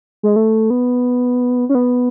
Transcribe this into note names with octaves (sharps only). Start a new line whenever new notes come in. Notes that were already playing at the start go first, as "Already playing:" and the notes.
G#3
A3
B3
C#4
B3